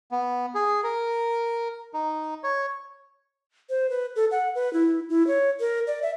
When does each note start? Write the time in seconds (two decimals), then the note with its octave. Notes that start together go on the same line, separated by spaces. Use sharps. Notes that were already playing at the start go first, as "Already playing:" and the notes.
0.11 B3
0.55 G#4
0.84 A#4
1.94 D#4
2.44 C#5
3.70 C5
3.90 B4
4.16 A4
4.31 F#5
4.55 B4
4.73 E4
5.09 E4
5.27 C#5
5.60 A#4
5.87 D5
6.02 E5